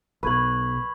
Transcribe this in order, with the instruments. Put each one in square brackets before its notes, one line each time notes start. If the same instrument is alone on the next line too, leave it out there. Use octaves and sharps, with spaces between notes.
[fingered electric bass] B1 [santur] B4 [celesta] C#6 G#6 F#7